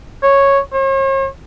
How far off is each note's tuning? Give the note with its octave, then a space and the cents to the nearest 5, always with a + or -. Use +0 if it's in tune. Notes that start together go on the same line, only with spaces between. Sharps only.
C#5 -5
C#5 -45